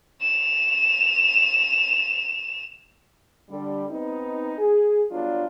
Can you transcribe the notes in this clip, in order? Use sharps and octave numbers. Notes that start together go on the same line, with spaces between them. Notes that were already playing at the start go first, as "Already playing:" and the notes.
E7 F7
D3 G3
B3 C4 D#4
G#4
F#3 G3 B3 D4 F4